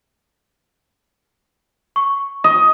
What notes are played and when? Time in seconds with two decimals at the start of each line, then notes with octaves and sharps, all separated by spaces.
1.96 C#6
2.44 D#5